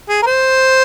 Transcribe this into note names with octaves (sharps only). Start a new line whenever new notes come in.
G#4
A#4
C5